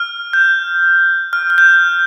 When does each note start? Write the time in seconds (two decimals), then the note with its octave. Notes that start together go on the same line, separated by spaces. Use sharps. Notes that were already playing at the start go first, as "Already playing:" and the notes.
Already playing: F6
0.33 G6
1.33 F6
1.50 F6
1.58 G6